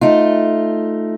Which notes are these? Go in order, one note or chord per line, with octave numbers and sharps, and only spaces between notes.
A3 D#4 F4